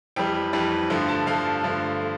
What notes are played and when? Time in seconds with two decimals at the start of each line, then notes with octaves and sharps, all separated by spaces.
0.16 F2 E3 G3 G5
0.53 F2 E3 G3
0.90 G2 D3 F3 A3
1.09 A5
1.27 G2 D3 F3 A3 F5
1.64 G2 D3 F3 A3
2.01 A3